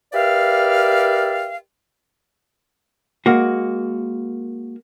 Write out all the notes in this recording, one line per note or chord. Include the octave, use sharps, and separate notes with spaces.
G4 A#4 B4 D5 E5 F5
G#3 A#3 F#4